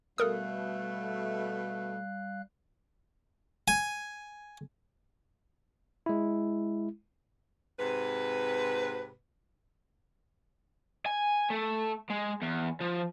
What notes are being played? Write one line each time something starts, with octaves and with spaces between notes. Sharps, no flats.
B2 G3 A3 A4 A#4 F5 D#6 F#6
G#5
G#3 E4
G#2 C3 B4
G#5
A3
G#3
E2
F3